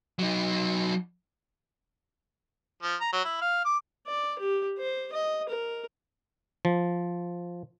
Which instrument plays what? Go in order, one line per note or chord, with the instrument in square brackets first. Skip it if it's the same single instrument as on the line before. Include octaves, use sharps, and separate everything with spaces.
[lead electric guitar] F#3 D#4
[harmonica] F3
A#5
F#3
E4
F5
D6
[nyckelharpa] D5
G4
C5
D#5
A#4
[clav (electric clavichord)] F3